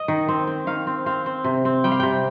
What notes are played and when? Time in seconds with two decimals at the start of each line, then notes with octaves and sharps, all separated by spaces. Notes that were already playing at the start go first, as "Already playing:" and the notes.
Already playing: D#5
0.08 D#3
0.28 C4
0.47 C4
0.67 D#3 F5
0.87 C4
1.06 C4 F5
1.26 C4
1.44 C3
1.65 C4
1.84 G3 G5
1.92 F5
2.00 C3 G5